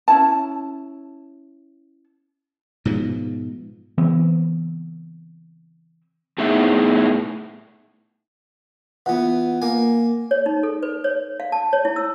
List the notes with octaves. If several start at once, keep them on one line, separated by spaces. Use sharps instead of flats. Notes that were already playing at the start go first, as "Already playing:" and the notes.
C#4 E4 A5
G#2 B2 F3
C#3 E3 B3 C4
A2 B3 D#4 E4 G#4 E5
E3 B3 F4 F#5
A#3 G#5
C#5
D#4
A4
B4
C#5
F5
A5
C#5
E4
E6